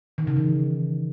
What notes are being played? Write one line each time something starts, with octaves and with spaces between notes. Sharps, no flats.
D#3
C#3
E3